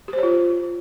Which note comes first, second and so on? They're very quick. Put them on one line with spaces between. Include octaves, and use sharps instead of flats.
G4 C5 C#5 F4